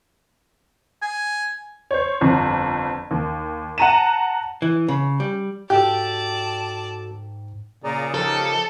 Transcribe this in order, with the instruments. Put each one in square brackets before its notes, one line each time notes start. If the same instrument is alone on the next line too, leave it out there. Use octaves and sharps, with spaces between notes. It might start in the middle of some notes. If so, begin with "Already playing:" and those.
[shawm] G#5
[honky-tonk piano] C5 C#5
G1 F2
D#2
F#5 A5 A#5 D#7 E7
[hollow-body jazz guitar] E3
C#3
G3
[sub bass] G#2 [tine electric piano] F#4 A4 [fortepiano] G4 [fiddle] D5 A5
[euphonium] A#2 [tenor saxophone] C#3 [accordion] G#4 D5 A#5
[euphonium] F3 [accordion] D#4 G4 A#4 [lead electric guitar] A4